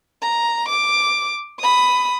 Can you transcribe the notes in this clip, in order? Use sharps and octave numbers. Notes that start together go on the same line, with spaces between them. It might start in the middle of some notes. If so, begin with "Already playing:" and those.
A#5
D6
B5 D#6